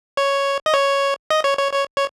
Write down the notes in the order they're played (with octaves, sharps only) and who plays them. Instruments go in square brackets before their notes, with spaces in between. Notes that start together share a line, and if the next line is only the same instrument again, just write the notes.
[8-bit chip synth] C#5
D#5
C#5
D#5
C#5
C#5
C#5
C#5